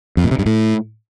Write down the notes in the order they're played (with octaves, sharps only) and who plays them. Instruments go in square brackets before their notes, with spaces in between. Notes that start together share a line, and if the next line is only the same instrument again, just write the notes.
[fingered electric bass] F2
A#2
C3
G2
A2